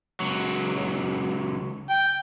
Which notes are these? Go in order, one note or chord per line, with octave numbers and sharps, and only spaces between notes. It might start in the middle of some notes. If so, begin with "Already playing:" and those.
C#2 F#3
G5